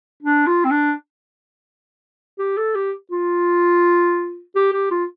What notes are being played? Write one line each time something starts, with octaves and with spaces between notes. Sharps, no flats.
D4
F4
C4
D4
G4
A4
G4
F4
G4
G4
F4